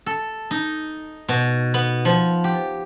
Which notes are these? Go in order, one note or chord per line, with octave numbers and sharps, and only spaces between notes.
A4
D#4
B2
B3
F3
G4